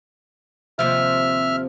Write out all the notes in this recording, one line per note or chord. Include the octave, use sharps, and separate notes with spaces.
D#2 C3 F3 E5 F6